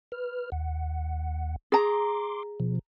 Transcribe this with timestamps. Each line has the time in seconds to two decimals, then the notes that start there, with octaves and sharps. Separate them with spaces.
0.12 B4 F6
0.52 D#2 F#5
1.72 G#4 A#5 C6 D6
2.60 B2 F3